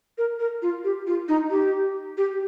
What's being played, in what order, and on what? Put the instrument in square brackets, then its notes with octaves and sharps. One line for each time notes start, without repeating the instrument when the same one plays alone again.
[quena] A#4
A#4
F4
G4
F4
D#4
G4
G4